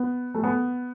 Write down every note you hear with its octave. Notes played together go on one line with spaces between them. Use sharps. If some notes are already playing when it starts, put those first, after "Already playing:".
Already playing: B3
A3
B3